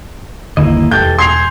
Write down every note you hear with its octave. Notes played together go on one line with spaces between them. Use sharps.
G1 D#2 D3 A#3 E4 D#5
E1 E3 G4 A4 G6
G#5 C6 C7 F7